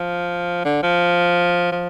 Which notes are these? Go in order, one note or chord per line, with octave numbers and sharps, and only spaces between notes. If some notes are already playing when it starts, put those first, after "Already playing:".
Already playing: F3
D3
F3
F3